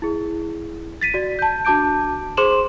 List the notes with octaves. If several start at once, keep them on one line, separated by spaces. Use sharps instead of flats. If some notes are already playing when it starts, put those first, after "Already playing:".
E4 G#4
A6 B6 D#7
F#4 D5
A5 G6
D4 F#4 A5 D6 G6 D7
G#4 C5 C6 D6 E7 F#7